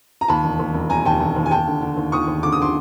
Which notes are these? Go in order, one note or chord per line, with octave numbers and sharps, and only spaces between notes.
A#5
D#2 A5 B5
E1
D#2
E1
E1 G#5 A#5
D#2 G5 A5
E1
D#2
G#5
D#2 G5 A5
D3
D3
D#2
D#2 C#6 D#6
D#2
D3 D6
D#6
D3 C6 D6